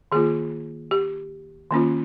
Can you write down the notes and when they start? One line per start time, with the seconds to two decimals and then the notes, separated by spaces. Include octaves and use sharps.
0.12 D#3 A#3 F4 G#4
0.91 G4
1.71 D#3 A#3 C#4 F4